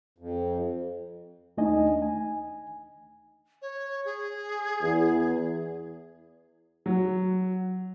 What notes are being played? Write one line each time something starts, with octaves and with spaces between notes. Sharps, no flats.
F2
D#2 A3 D4 D#4 D#5 G#5
G#5
C#5
G#4
E2
F#3